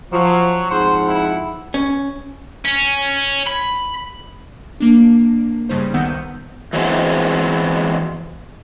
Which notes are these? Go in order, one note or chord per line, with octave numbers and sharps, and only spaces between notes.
F3 F#3
F2 G#2 C5 F#5
E4
C#4
C#4
B5
A#3 D4
G2 C#3 G3 D#4 C5
C2 D#3 B3 F#5 E6 G6
E3 F#3 G#3 B3 C4